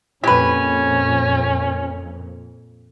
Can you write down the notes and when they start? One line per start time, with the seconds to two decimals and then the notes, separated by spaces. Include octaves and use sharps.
0.24 F2 A#2 C#4 G4 B4